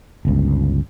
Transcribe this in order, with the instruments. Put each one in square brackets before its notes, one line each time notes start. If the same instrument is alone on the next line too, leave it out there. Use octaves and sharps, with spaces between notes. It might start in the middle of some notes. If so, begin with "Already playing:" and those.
[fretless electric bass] G1 C#2